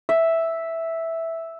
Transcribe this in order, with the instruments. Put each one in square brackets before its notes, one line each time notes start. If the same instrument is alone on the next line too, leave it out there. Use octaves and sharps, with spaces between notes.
[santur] E5